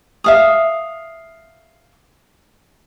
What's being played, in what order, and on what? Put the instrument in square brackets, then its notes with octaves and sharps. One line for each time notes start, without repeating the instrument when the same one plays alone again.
[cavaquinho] E5 F5 D#6